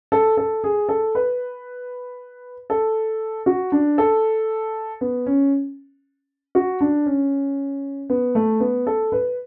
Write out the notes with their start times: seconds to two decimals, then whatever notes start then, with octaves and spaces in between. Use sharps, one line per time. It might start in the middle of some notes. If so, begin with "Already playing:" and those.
0.12 A4
0.37 A4
0.64 G#4
0.89 A4
1.15 B4
2.70 A4
3.46 F#4
3.72 D4
3.98 A4
5.01 B3
5.26 C#4
6.55 F#4
6.81 D4
7.06 C#4
8.10 B3
8.35 A3
8.60 B3
8.87 A4
9.12 B4